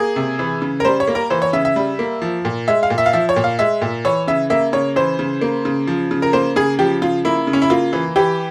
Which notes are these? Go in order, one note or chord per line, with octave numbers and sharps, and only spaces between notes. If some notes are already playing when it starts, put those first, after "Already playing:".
Already playing: A#3 G#4
C3
E3
C#3
A#4
G3 C5
C#5
A#3
A#4
E3 C5
C#5
C#3 E5
E5
G3
A#3
F3
A#2
G#3 E5
F5
A#2
E5
F5
F3 E5
C#5
A#2
F5
G#3 E5
A#2
E3 C#5
C#3 E5
A#3 E5
C#3 C#5
E3 C5
C#3
A#3
C#3
F3
C#3
A#4
A#3 C5
C#3 G#4
F3 G4
C#3 F4
A#3 E4
C#3
C#4
E4
A#3 F4
E3
E3 G4